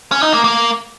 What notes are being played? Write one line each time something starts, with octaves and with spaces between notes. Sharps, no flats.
C#4
D#4
A#3
A#3